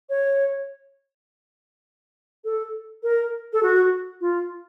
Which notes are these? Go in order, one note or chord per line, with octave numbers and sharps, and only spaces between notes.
C#5
A4
A#4
A4
F#4
F4